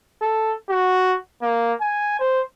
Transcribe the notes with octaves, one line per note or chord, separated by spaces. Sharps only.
A4
F#4
A#3
G#5
C5